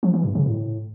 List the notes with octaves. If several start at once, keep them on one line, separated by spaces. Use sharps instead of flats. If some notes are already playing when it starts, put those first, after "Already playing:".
F3
E3
G2
C#3
A2